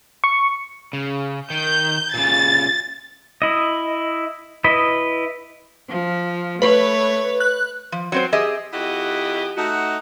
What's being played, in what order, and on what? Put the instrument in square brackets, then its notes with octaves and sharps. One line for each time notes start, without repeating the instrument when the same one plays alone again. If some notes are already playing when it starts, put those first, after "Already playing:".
[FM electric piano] C#6
[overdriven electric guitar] C#3
[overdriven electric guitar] D#3 [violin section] G6
[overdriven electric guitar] A#2 C#3 [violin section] A6
[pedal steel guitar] E4 D#5
E4 B4 D#5
[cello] F3
[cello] A3 C#5 [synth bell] B4
[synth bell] F#6
[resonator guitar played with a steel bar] F3
F#3 C4 C5
G4 G#4 D#5 E5
[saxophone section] F2 E4 F#4 G4 D#5 F#5
A3 D#4 F#4